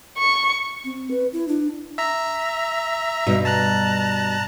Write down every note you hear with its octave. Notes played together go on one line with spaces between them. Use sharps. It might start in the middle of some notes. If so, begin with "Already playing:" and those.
C#6
C4
B4
E4
D4
E5 A#5
G2 B2
A5 A#5 F#6